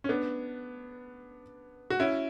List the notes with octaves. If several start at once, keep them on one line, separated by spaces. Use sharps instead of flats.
C#4
B3 D4
F#4
C#4 E4